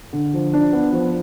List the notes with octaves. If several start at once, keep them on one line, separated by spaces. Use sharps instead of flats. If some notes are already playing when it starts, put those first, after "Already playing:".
D3
F3
D4
B3
F3